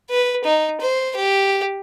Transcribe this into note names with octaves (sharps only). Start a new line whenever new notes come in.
B4
D#4
C5
G4